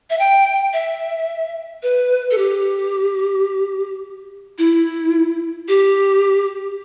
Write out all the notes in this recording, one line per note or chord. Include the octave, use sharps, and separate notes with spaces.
E5
G5
E5
B4
A4
G4
E4
G4